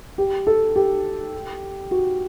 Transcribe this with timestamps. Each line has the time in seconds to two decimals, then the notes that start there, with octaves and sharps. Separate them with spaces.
0.18 G4
0.47 A4
0.76 G4
1.91 F#4